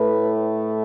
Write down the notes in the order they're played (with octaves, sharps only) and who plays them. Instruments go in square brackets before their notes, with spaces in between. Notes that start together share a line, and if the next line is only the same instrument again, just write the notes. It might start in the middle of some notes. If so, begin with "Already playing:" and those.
Already playing: [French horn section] A2 A3 B4